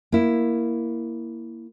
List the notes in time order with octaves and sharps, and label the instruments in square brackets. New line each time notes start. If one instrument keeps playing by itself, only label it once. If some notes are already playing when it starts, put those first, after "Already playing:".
[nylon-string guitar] A#3 E4